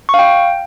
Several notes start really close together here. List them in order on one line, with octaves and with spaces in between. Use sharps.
C#6 F5 G5